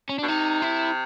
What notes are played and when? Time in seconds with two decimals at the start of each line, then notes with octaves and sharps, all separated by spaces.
0.09 C#4
0.19 B2 D4
0.28 C3 D#4
0.62 E4